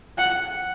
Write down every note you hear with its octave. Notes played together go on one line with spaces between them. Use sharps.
F#5